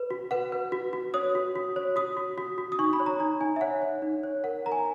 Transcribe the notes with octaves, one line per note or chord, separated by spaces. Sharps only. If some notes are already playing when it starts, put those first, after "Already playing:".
Already playing: B4
F#4
B4 F#5
B4
F#4
F#4
C#5 D#6
F#4
F#4
C#5
F#4 D#6
F#4
F#4
F#4
D#6
D#4 C#6
B5
C#5
A#5
D#4 A#5
D#4 G#5
E5
C#5 F#5
C#5
D#4
C#5
A#4 F#5
A#4 A#5
G#5